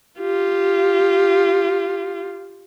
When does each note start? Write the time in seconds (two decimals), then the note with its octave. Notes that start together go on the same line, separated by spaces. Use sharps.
0.20 F4 G4